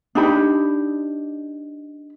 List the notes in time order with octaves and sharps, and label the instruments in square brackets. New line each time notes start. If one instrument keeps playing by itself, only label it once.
[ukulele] D4 D#4 G4 B5